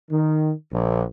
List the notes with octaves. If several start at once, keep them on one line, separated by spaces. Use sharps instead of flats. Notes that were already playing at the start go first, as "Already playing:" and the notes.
D#3
A#1